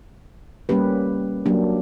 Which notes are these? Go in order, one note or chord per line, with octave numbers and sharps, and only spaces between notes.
G3 A#3 C#4 G4 B4
F#3 A#3 D4 G4